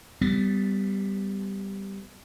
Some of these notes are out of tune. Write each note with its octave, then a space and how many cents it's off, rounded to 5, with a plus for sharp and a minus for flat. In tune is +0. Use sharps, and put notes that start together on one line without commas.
G3 +0 B3 +25